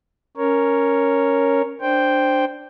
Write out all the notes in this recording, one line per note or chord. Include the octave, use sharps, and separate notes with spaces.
C#4 A#4 C#5
D4 C5 G5